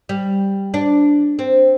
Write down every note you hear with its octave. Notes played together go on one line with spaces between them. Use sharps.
G3
D4
C4